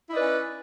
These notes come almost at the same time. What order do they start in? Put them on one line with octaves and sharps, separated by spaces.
E4 D#4 D5 B4 C#4